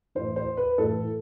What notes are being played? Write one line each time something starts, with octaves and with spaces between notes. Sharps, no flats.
A2 E3 C5
C5
B4
A2 E3 A4